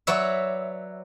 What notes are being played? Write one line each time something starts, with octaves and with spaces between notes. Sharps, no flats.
F#3 B4 C#5 D5 E5